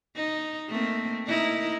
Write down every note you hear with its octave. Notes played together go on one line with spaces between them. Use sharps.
D#4
A3 A#3 C4
A#3 D#4 E4